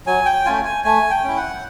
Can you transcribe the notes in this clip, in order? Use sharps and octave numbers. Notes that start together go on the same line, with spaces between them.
F#3 G#5
G5
A3 C#4 F4 G#5
G#5
A3 G#5
G5
C#4 E4
F#5